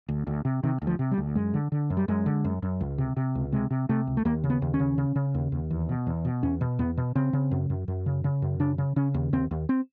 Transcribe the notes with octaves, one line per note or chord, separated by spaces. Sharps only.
D2
D2
C3
C3 D#3
D2
F3
C3
G3
D2
F#2 G#3
D3
D3
F#2
G3
F#2 G#3
D3
F#2
F#2
C#2
C3
C3
C#2
C3 G#3
C3
C3 A3
C#2
A3
D#2 A#3
C#3
B3
D#2
C#4
C#3
C#3
C#3
D#2
D#2
E2
B2
E2
B2
E2 C#4
B2
E2 B3
B2
C#3 C4
C#3
F#2
F#2
F#2
C#3
C#3
F#2
C#3 D4
C#3
C#3 C#4
D#2
D#2 C4
D#2
C4